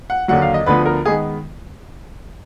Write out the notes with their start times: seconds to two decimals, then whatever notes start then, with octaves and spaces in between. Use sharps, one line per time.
0.10 F#5
0.28 D#2 D3 F#3 F#5
0.42 F5
0.54 D#5
0.66 D2 D3 F3 B3 B4
0.86 A#4
1.05 D#3 G#3 B3 G#4